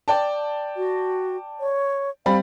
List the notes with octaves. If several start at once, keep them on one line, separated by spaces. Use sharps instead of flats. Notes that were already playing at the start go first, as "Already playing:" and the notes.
D5 G5 A5
F#4
C#5
G3 C4 F5 B5